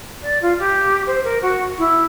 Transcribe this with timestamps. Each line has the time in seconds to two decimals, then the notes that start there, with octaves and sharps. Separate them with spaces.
0.22 D5
0.42 F4
0.59 G4
1.06 C5
1.24 A#4
1.42 F#4
1.78 E4